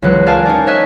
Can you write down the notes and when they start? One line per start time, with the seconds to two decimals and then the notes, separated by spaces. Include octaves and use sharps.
0.02 C#2 E3 F#3 F#6
0.26 A#4 D5 F5 G#5 A5
0.45 C#4 D#4 A#4 D5
0.67 C#5 D#5 E5 G#5 F#6